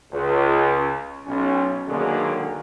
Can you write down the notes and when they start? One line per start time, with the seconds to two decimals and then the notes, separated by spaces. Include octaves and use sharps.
0.13 C#2
1.26 B1 C#4
1.89 B2 D3 D#3 F#3 G#3 A#3